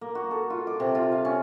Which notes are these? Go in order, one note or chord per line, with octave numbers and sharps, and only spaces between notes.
A#3
F#4
A4
F4
D6
C3
F4
F5
C#4